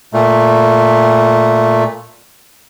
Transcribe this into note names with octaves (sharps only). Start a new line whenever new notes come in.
A#2 A3